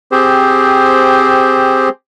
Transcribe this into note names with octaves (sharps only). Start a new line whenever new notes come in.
C4 G4 G#4 C5